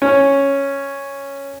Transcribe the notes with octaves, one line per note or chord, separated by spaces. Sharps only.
C#4